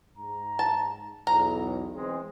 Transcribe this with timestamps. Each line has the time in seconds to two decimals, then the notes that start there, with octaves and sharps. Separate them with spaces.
0.17 G#2 A#5
0.59 A5
1.27 B1 E2 A#5
1.94 E3 G#3 C4